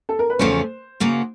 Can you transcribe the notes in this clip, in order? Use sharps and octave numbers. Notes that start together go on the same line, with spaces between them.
A4
A#4
B4
E2 C#3 F3 A3 C#4 C5
F#2 C#3 F#3 A#3